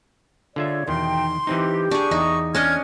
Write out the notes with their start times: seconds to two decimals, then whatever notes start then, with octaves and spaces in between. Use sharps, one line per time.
0.56 D3 F4 G#4 C#5 D5 E5
0.88 E2 B2 D#3 D#4 G5 C6
1.47 E3 C4 D#4 G4
1.91 D4 G#4 C#6
2.11 E2 D#4
2.55 C#4 D4 D#5 C#6 F6 G#6